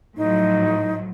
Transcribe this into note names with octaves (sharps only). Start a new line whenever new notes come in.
A2 F3 F#3 D#4